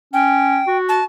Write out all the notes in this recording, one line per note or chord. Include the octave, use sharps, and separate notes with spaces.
C#4 G5
F#4
A5